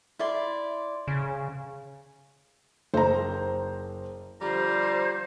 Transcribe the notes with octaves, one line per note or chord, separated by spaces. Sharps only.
E4 D5 C6
C#3
F#1 C5 A#5
D3 F3 G3 C5 A#5